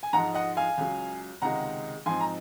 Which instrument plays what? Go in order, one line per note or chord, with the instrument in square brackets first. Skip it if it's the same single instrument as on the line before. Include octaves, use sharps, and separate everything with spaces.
[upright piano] G#5
G#2 F3 G#3 F#5 A#5
D#5 F#5
F5 G#5
C#2 C#3 F#3
C#2 C3 D#3 G#3 F#5 A#5
G#2 F3 C4 D#4 G#5 C6
A#5